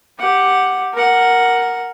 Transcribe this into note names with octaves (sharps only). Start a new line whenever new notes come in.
G4 F#5
A#4 F#5